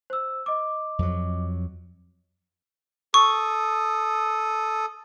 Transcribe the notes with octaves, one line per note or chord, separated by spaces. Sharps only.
C5 E6
D#5 D6
F2 F#3
A4 C#6 D#6